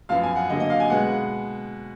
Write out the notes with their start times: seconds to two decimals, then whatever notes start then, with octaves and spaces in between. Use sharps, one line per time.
0.09 F#2 F3 B3 F5
0.23 G#5
0.36 F#5
0.50 D3 F#3 A#3 D#5
0.60 D#5
0.70 F5
0.80 G#5
0.90 B2 G#3 B3 F#5